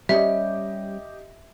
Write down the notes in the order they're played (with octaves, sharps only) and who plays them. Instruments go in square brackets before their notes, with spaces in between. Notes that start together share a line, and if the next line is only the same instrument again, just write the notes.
[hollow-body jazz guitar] G3 C#4 [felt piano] G4 D#5 [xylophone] E5